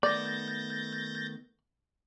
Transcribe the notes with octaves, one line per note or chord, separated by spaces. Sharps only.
D#3 A3 B3 D5 G6 A6 A#6